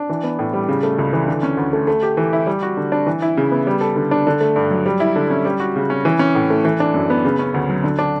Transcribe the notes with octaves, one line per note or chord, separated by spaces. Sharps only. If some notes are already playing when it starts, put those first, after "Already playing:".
Already playing: D4
E3
B3
A2
G3
C#3
A3
C#2
E3
D3
C#4
D2
A3
A3
G4
E3
E4
G3
F#4
D3
D4
E3
E4
C#3
B3
G3
A4
D3
D4
D3
A3
G2
F#3
G3
E4
D3
C#4
G3
F#4
C#3
C#4
E3
C#4
A2
A3
E3
D4
F#2
B3
C#3
C#4
D2
F#3
D3
D4